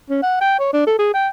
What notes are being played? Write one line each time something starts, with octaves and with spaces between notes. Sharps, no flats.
C#4
F#5
G5
C#5
D4
A4
G#4
G5